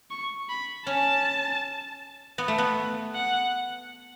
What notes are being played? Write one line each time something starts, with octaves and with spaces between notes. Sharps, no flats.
C#6
B5
C#4 A5
B3
A3
B3
F#5